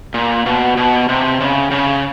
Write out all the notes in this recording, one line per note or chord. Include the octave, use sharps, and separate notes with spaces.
A#2
B2
B2
C3
C#3
C#3